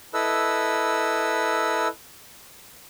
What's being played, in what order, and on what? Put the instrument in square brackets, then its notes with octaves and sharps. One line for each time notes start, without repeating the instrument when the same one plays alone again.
[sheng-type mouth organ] E4 A4 B4 D#5 E6